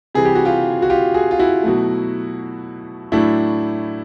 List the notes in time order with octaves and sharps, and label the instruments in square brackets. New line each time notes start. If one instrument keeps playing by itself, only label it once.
[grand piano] C3 E3 G3 G#4
G4
F#4
F4 G4
F#4
F4 G4
F#4 G#4
F4
E4 F#4
B2 F#3 A3
A2 F#3 A3 D4 E4